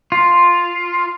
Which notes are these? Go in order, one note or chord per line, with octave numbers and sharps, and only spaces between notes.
F4